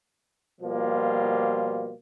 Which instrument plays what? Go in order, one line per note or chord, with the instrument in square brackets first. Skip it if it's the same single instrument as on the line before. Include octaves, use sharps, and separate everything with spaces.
[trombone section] B2 F3 G3 A#3 F4